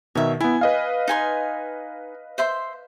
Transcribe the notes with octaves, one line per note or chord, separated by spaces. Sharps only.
B2 D#3 C#5 E5
B3 E4 G#5
B4 D#5 F5
D#4 G#5 C6
C5 E5 C6